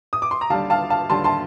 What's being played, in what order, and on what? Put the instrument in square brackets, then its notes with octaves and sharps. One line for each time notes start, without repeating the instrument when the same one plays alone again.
[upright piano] D#6
D6
C6
A#5
D#2 D3 G3 F5 A5
F5 A5
F5 A5
D#2 D3 G3 A5 C6
A5 C6